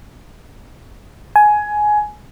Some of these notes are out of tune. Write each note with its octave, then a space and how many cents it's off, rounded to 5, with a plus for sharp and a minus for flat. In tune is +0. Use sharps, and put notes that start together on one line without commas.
G#5 +15